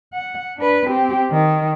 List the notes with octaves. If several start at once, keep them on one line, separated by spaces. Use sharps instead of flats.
F#5
D4 B4
C4 G4
D#3